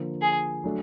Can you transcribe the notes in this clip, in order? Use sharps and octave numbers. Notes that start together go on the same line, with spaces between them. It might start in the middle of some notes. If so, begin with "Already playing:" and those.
Already playing: D3 F3 A#3
G#4
F#3 A3 D4